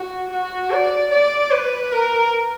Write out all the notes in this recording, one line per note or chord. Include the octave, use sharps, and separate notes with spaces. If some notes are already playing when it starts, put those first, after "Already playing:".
Already playing: F#4
F#4
D5
D5
B4
A#4